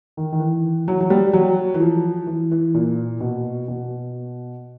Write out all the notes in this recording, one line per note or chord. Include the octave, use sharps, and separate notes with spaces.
D#3
D#3
E3
F#3
F#3
G3
F#3
E3
F3
E3
E3
A#2
B2
B2